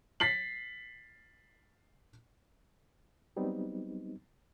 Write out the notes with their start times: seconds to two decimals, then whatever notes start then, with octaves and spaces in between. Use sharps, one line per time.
0.20 A6 B6 C7 F#7
3.36 F#3 G3 B3 C4 D#4